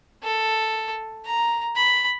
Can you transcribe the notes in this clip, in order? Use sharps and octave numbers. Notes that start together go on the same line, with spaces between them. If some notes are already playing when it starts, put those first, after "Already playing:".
A4
A#5
B5